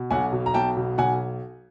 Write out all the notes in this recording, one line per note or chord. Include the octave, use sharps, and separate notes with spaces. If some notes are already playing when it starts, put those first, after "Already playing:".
Already playing: B2
B1 F#5 G#5
B2
A#5
B1 G5 A5
B2
B1 F#5 G#5